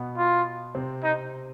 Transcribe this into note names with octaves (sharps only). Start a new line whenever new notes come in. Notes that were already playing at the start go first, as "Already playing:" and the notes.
Already playing: B2 B3
F4
C3 C4
D#4